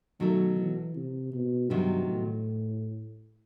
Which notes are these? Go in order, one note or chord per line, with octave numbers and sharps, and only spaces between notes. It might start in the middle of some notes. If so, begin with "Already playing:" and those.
B2 D#3 F#3 A3
E3
C3
B2
G2 C3 D#3 F#3 B3 E4
A2